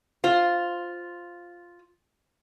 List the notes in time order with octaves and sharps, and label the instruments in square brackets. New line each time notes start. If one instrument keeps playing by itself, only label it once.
[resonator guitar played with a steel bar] F4 C5